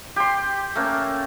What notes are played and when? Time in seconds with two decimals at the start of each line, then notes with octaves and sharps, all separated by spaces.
0.16 G4 C6
0.75 A3 A#3 C#4